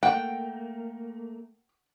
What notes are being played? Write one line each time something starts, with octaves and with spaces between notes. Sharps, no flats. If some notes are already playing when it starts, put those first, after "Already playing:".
A3 A#3 F#5 G5